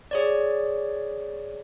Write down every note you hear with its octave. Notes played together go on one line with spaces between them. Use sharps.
G#4 C#5 D5